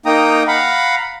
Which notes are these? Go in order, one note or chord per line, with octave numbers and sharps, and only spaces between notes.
A#3 D#4 G5 A#5 D#6
F5 F#5 A#5 B5